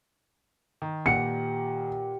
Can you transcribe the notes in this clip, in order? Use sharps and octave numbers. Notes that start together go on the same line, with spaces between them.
D#3
A#2 G4 B4 F#5 C#7